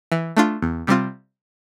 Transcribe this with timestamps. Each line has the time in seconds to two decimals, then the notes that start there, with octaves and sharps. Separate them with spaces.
0.12 E3
0.37 A3 D4 F4
0.62 E2
0.87 C3 G3 C4 F4